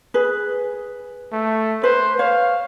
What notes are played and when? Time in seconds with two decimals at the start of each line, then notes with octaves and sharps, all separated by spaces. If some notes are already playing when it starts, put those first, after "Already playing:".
0.14 G#4 B4
1.32 A3
1.83 B4 C5
2.19 C#5 F5